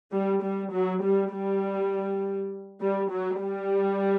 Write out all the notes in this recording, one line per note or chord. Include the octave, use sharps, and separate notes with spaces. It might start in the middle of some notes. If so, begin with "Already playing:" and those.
G3
G3
F#3
G3
G3
G3
F#3
G3